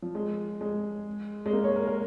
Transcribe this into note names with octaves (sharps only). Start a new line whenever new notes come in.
F3
G#3
G#3
G#3
A#3
C#5
A#4
A#4